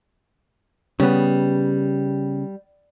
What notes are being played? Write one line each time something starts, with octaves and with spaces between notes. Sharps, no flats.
C#3 G3 B3